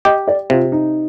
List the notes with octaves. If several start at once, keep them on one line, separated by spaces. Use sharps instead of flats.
G4 D#5
D5
C3 F4
D#4